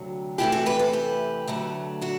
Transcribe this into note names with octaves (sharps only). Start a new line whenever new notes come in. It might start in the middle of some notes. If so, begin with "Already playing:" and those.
Already playing: D2 C3 F#3
E2 C3 E3 A3 E4 G4
F#4 A4
G4 B4
A4 C5
G4 B4
D2 D3 F#3 A3
D4 F#4